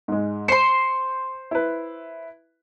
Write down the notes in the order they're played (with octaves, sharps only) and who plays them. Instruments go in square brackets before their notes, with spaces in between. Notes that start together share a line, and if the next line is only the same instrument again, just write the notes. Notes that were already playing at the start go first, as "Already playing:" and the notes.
[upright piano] G#2 G#3
[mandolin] C5 C6 [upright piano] C#7
[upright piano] E4 B4